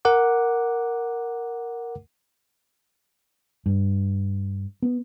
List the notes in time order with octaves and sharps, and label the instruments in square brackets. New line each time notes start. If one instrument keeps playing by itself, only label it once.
[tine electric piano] A#4 F#5 D6
[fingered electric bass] G2
B3